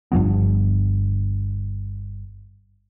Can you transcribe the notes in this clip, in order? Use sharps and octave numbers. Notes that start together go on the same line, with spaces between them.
G1 G2 F3 B3